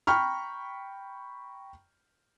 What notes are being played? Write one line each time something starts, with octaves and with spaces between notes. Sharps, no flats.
G5 A#5 B5 C#6 F6